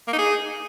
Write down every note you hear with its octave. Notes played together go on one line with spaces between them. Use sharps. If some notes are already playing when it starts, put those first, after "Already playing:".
A#3
D#4
G#4